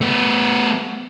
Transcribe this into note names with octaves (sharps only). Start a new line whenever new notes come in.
A3 B3